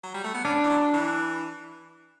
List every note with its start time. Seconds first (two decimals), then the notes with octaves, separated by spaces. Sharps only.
0.04 F#3
0.14 G3
0.24 A3
0.34 B3
0.45 C#4 D4
0.64 E3
0.69 F#3
0.94 E3